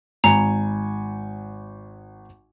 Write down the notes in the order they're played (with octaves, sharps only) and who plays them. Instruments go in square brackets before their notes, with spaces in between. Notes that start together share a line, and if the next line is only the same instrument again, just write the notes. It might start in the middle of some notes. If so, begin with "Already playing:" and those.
[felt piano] G#1 G#5 C#7 [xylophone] A#5